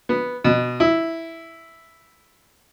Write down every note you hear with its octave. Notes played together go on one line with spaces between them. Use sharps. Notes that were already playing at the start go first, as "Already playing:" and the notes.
B3
B2
E4